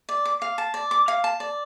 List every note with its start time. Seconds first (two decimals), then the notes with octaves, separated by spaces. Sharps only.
0.09 D5
0.25 D6
0.42 F5
0.58 A5
0.74 D5
0.91 D6
1.08 F5
1.24 A5
1.40 D5